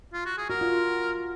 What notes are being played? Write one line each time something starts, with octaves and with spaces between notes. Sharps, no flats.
F4
F#4
G#4
F#4 A#4
F4